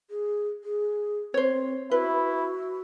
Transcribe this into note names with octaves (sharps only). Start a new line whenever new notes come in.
G#4
G#4
C4 C5 C#5
E4 F#4 B4